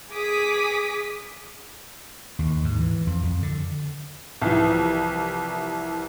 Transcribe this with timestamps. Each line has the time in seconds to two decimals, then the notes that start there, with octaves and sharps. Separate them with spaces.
0.12 G#4 D6 D#6 B6
2.39 D#2
2.65 G#2
2.80 E3
3.07 F2
3.23 F2
3.43 D3
4.42 C2 E3 F3